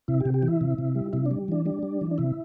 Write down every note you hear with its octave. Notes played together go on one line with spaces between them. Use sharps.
C3 E4
G4
C3
G4
E3
E4
C3
C3
G3
C3 E4
D4
G3
E3 D4
G3 D4
G3
E3
D4
C3 E4